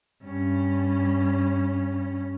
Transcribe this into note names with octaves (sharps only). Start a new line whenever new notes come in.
G2 C#4